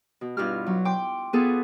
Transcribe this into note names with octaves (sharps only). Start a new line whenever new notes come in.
B2
G2 B2 E4 F4 G4 F6
F#3
G5 C6 D6
B3 F4 G#4 A4 B4